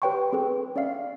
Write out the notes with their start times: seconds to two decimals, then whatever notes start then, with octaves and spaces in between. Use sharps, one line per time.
0.02 G4 B4 C#5 G5 C6 C#6
0.33 C4 G#4 A4 B4
0.76 C#4 D5 E5 F5 C7